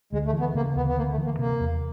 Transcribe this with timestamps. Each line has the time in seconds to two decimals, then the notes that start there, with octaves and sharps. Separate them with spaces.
0.13 D2 G#3
0.26 A3
0.33 E3
0.40 B3
0.55 C#3 A#3
0.75 D2 B3
0.87 B3
0.97 D2 A#3
1.11 A3
1.18 E3
1.25 A#3
1.39 C3 A#3
1.60 E2